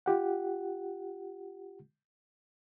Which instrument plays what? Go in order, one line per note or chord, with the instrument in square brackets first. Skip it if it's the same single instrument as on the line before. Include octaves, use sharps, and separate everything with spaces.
[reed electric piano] F4 G4 F#5